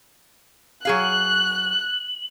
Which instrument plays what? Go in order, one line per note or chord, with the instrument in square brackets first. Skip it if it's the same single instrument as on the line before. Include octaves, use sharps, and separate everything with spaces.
[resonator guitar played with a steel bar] F#3 G#4 F5 [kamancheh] F#6 [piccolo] F#7